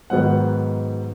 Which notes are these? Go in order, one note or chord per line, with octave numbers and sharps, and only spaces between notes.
G#2 D#3 F#3 B3 F#5